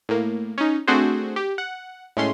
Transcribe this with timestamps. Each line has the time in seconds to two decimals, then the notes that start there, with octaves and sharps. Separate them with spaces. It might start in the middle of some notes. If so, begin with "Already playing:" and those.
0.09 A2 A#3
0.58 C#4 D#4
0.87 A3 C4 D4 F#4 G#4 C5
1.36 G4
1.58 F#5
2.17 A2 G#3 A3 C#4 C6